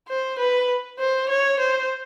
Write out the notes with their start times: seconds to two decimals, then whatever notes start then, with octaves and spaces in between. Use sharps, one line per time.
0.08 C5
0.38 B4
0.99 C5
1.29 C#5
1.59 C5